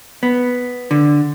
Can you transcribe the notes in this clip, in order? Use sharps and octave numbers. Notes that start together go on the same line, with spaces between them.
B3
D3